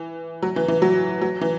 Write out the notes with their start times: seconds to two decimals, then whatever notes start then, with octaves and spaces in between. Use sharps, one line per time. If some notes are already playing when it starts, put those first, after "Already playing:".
Already playing: E3
0.43 F#3
0.56 E3
0.68 E3
0.82 F#3
1.21 F#3
1.41 E3